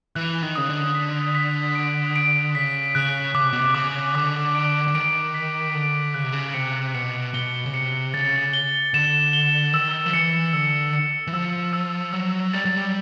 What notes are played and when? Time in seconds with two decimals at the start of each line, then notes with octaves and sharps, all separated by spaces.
0.16 E3 F#6
0.42 D#3
0.55 C#3 D#6
0.69 D3
0.95 B6
1.35 B6
1.75 D7
2.16 D7
2.55 C#3 B6
2.95 C#3 F#6
3.35 C#3 D6
3.44 C3
3.52 B2
3.61 C3
3.75 C#3 D6
4.15 D3 D6
4.55 D7
4.88 D3
4.94 D#3 D7
5.34 B6
5.74 D3 D7
6.14 C#3 F#6
6.24 C3
6.32 C#3
6.54 C3 C#7
6.94 B2 C#7
7.34 B2 G7
7.65 C#3
7.74 C3 C#7
8.14 C#3 A6
8.53 G7
8.94 D3 E7
9.33 G7
9.73 D#3 E6
10.06 F3
10.14 E3 C#7
10.53 D3 E6
10.93 C#7
11.27 E3
11.33 F3 E6
11.73 E6
12.13 F#3 E6
12.53 G3 A6
12.65 F#3
12.76 G3